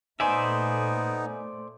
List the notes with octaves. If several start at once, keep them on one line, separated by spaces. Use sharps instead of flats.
A#2 A3 B3 D#4 C5 D5 E5 G#5